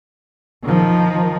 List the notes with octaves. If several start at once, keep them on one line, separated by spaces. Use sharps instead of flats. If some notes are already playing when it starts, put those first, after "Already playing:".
D#3 F3